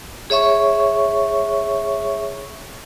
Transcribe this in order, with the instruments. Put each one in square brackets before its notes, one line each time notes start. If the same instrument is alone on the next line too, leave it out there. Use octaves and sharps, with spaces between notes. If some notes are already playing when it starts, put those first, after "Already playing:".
[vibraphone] G#4 C#5 E5 C#6